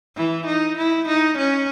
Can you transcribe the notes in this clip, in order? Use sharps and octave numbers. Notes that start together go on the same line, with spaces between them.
E3
D#4
E4
D#4
C#4